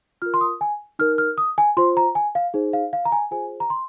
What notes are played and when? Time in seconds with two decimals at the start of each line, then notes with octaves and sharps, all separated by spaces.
0.22 F4 A#4 F6
0.34 C6
0.41 D#6
0.61 G#5
0.99 D#4 A#4 F6
1.18 F6
1.38 D#6
1.58 G#5
1.77 F4 C5 C6
1.97 A#5
2.15 G#5
2.35 F5
2.54 D#4 G#4 C5
2.73 F5
2.93 F5
3.05 A#5
3.12 G#5
3.31 F4 G#4 C5 G#5
3.60 A#5
3.70 C6